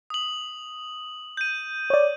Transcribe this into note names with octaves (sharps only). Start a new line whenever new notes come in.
D#6 F#7
G6 D#7
C#5 D5